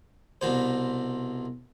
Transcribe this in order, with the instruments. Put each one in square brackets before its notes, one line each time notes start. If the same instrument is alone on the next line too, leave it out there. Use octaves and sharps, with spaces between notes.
[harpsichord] C2 B2 C5